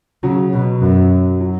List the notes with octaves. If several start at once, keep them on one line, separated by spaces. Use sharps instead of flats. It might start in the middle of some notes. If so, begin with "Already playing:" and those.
C#3 F#3
B2
F#2
F#3